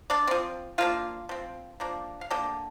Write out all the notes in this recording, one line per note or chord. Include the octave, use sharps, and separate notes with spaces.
D4 D5
F3 C4
F3 A#3 D4 F4 F5
F3 C4
F3 A#3 D4
F5
D3 A#3 D4 G4 G5